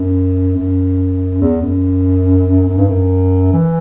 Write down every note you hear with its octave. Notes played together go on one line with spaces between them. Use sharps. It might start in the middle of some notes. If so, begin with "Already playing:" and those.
Already playing: F#2
F#2
E2
F#2
F#2
G2
F#2
E3